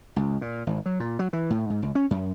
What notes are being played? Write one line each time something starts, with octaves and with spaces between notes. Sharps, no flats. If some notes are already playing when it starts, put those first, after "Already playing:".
C#2
A#2
G#1
F#3
A#2
F#3
E3
A2
G#2
C#2
C#4
F#2